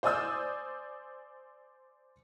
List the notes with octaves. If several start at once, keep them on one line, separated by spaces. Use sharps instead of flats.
C5 D5 G#5 D#6 E6 G6